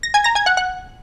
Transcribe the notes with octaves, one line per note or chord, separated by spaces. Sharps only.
A#6
G#5 G#6
A#5 A#6
G#5 G#6
F#5 F#6
F#5 F#6